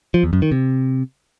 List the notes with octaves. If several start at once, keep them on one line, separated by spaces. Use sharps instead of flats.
F3
E2
F#2
D#3
C3